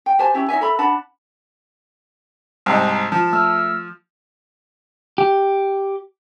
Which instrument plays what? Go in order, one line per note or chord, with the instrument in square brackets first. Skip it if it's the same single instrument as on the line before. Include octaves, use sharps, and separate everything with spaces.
[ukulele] G5
G4 C5 G#5 A5
C#4 E4 G4
D#4 C#5 E5 G#5
A4 E5 B5
D4 F#5 A5 B5
[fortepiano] C2 G#2 [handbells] A5 A#5 D#6
[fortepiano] F3 [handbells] A5
[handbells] A3 E6 F6
[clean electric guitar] G4